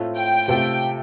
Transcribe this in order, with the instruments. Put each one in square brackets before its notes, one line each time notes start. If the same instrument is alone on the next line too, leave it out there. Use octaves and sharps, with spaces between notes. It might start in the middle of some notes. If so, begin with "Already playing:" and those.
Already playing: [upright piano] A2 A3 C4 F4
[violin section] G5
[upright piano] C3 A3 C4 F4 A4 [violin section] G5